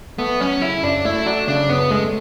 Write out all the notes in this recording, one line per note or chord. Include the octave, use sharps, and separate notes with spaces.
A3 B3
F#3 C#4
C#3 E4
F#2 D4
A3 E4
F#3 D4
C#3 D4
F#2 B3
G#3 A3